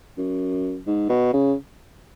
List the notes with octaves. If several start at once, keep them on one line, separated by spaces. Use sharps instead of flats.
F#2
G#2
B2
C#3